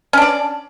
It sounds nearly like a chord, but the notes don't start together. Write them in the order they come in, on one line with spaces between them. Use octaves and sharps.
C#4 D4 D5